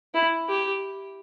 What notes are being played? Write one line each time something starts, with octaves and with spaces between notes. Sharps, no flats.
E4
G4